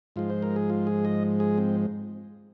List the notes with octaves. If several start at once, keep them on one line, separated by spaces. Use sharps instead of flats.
G#2 F3 G#3 F4
C5
A#4
G#4
F4
G#4
D#5
G#4
C4